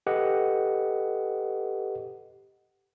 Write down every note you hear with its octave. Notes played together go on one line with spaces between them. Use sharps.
G4 A4 B4 D#5 F#5